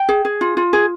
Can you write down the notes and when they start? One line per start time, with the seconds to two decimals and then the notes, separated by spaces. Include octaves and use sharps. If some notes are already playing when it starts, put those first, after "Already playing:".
Already playing: G5
0.09 G#4
0.25 G#4
0.41 F4
0.57 F4
0.73 G#4